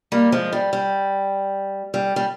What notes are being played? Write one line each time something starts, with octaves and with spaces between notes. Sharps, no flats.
G3 A#3
F3 G#3
G3
G3
G3
G3